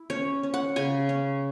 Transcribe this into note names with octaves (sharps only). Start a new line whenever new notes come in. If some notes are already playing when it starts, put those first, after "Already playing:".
Already playing: E4
C#4 C#5
C#4
F#5
C#3 G#5
C#4